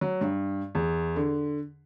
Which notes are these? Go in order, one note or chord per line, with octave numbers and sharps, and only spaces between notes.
F#3
G2
E2
D3